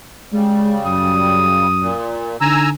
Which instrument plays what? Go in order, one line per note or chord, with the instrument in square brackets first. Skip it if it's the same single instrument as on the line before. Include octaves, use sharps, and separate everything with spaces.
[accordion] C#3 G3 [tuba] G#3
[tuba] F#2 [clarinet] D#6
[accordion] A#2
[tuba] D3 [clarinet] D#4 [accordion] G#5 A#5 E6